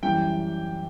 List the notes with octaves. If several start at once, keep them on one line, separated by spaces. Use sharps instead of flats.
F#2 E3 G3 G5